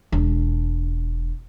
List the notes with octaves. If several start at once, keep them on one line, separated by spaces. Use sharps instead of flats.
E1 D4